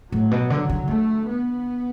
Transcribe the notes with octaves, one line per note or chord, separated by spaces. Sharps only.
A2 F#3
B2
D3
D3
D3 A3
B3